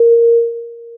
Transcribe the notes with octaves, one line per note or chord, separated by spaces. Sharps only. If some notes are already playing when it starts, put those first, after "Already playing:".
Already playing: A#4